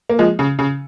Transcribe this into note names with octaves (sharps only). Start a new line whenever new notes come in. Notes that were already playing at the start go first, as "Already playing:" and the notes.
A#3
F3 G#3
C#3
C#3